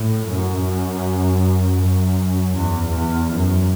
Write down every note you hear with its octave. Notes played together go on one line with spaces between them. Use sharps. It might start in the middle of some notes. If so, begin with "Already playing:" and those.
Already playing: A2
F#2
F#2
E2
E2
F#2